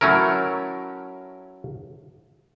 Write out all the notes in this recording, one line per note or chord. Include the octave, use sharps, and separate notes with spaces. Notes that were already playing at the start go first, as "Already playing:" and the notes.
F#3 A3 C#4 E4 A#4